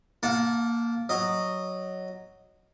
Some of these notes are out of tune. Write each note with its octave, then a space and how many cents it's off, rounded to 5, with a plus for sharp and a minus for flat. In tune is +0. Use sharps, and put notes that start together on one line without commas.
A#3 +0 F#5 -35 A5 -10
F#3 +0 D#5 -10